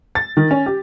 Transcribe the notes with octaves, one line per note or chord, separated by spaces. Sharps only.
A6
D#3
C#4
G4